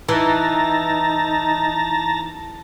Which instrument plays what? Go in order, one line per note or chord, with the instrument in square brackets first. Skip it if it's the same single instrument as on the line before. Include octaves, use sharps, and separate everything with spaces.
[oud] E3 [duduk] D#4 [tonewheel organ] A5 A#5